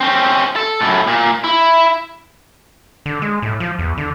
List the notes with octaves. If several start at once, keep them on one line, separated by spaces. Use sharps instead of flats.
C4 C#4
A4
F#2 A2
A#2
E4
D3
G#3
A2
F3
E2
D3